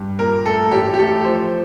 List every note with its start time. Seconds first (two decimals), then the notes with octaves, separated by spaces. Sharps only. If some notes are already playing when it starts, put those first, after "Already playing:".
Already playing: G2
0.19 A#2 A#4
0.45 A3 A4
0.71 A1 G4
0.94 G4
0.98 A3 A4
1.25 F3 C5